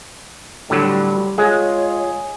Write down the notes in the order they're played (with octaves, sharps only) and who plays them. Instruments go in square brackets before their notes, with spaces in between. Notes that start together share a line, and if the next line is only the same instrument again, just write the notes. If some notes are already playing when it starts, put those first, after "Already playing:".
[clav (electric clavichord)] A2 D3 F#3 [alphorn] G3
[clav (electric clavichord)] G#3 [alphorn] F4 [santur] G#4 [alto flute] C#5